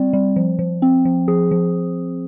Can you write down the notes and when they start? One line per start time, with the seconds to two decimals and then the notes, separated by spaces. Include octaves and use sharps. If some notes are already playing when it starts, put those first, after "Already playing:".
Already playing: G3 C4 D5
0.13 G3
0.36 F3
0.59 F3
0.82 C4
1.05 F3
1.28 F3 G#4
1.51 F3